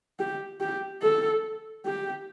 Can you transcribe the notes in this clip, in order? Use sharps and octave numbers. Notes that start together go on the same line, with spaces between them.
G4
G4
A4
G4